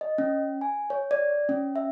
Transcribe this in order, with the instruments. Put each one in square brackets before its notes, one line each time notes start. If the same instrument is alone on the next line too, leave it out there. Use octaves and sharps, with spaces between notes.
[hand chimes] D#5
C#4
G#5
C#5
D5
C#4
E5